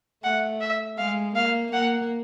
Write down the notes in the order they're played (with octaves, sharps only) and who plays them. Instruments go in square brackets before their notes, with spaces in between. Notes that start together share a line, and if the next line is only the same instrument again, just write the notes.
[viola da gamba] A3 [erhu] F#5
[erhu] E5
[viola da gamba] G#3 [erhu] F5
[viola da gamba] A#3 [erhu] F5
[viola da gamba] A#3 [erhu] F#5